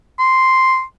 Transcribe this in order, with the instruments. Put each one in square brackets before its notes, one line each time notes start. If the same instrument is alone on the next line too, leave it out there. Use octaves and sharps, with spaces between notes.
[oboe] C6